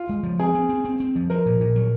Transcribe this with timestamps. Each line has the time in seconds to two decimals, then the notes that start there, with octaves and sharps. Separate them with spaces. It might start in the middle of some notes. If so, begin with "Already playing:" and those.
Already playing: F4
0.09 G#3
0.23 F3
0.39 C4 G#4
0.54 C4
0.69 C4
0.85 C4
1.00 C4
1.16 F3
1.30 F3 A#4
1.46 A#2
1.61 A#2
1.76 F#3